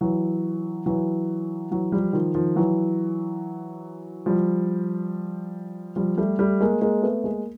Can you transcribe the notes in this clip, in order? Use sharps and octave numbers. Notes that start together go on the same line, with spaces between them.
E3 F#3
E3 F#3
E3 F#3
F3 G3
D#3 F3
D#3 F3
E3 F#3
F3 G3
F3 G3
G3 A3
G3 A3
G#3 A#3
G#3 A#3
A3 B3
G#3 A#3